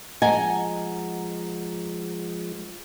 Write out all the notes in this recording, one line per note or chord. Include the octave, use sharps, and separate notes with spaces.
F3 G#3 D#5 F#5 G#5 A#5